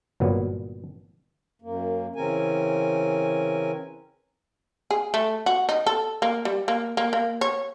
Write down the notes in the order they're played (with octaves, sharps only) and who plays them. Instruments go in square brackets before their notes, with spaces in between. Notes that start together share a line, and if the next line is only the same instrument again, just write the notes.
[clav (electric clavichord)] G1 A#2 F#3 B3
[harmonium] F#2 A#3
C#3 E3 C4 C#4 A#4 G#5
[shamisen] G#4
A3
F#4
D#4
A4
A#3
G3
A#3
A#3
A#3
C#5